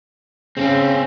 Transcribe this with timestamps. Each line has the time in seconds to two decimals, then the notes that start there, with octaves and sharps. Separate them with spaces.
0.57 C#3 C4 C#4